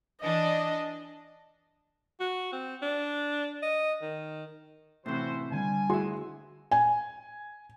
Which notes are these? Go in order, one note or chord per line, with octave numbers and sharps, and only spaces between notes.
E3 D4 D#5
F#4
C4
D4
D#5
D#3
A2 C3 E3 E4 F#4 C5 E5
D3 G3 G#5
D2 E4 F#4 G#4 C6
G#5